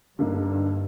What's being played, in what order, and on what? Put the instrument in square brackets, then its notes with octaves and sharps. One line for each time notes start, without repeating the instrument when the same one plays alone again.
[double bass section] G2 [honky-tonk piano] D3 A#3 D#4